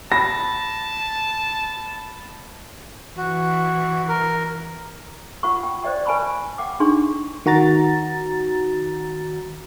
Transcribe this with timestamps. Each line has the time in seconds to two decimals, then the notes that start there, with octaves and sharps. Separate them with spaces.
0.12 A5 B5 A#6
3.17 E3 F#4
4.09 A#4
5.43 F4 F#5 B5 C#6
5.63 G5
5.82 C5 D5 D#5 G5 C#6
6.06 B4 G#5 A5 B5 C#6
6.58 F#5 G5 D6
6.80 D4 D#4 G#4 C6 C#6
7.46 D#3 F#4 A#5 A6